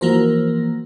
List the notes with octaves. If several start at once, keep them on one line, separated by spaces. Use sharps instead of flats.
E3 F3 A#3 F#4 A#4 C5